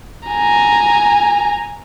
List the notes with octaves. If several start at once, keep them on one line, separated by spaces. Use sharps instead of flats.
G#5 A#5